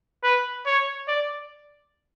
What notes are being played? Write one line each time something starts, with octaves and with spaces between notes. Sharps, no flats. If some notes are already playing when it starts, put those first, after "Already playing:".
B4
C#5
D5